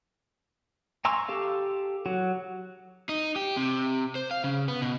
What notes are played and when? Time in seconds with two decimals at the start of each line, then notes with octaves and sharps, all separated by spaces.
1.05 G#5 A#5 C6 C#6 E6
1.28 G4 A4 F5
2.06 F#3 F#4
3.09 D#4
3.36 G4
3.57 C3
4.15 C5
4.31 F5
4.44 C#3
4.68 B3
4.82 B2